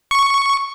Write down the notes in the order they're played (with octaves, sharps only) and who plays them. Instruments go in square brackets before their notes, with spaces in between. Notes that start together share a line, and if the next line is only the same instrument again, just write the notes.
[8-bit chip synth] C#6